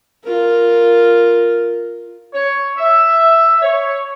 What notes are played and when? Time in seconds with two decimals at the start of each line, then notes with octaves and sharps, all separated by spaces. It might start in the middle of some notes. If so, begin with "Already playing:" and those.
0.24 F4 A#4
2.34 C#5
2.78 E5
3.62 C#5